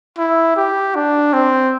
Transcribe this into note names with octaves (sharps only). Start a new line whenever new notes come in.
E4
G4
D4
C4